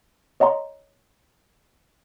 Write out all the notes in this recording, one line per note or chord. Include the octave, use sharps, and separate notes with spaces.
C#5 D#5 F#5 A#5 C6